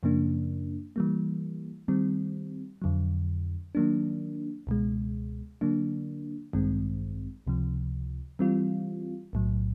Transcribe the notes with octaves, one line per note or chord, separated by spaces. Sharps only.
F#2 C#3 F3 A#3 D4
E3 G3 A#3
D#3 G3 C4
F2 D3 F#3
D#3 F#3 A#3 D4
C#2 B2 G#3
D3 F#3 A#3 D4
A1 G2 D#3 G#3 C4
C#2 C3 F3
E3 G3 C4 F4
B1 A2 F#3